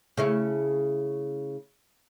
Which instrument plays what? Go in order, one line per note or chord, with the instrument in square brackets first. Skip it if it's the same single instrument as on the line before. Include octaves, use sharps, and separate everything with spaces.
[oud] C#3 A3 E4